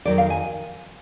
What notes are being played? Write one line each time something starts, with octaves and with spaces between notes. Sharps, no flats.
F2 D#3 F#3 D5
F5
G#5